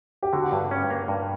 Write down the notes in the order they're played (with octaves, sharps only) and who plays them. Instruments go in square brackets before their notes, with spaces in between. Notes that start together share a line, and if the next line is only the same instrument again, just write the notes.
[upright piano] G4
[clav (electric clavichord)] D3 [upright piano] F#4
[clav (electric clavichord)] G2
C#4
A#3
G2